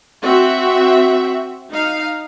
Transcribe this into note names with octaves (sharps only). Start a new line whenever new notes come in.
C4 F#4 E5
D#4 F5